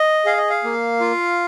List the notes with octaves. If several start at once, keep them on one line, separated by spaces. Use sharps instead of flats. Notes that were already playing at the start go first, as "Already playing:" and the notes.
Already playing: D#5
G#4 F5
D#5
F5
A#3
F4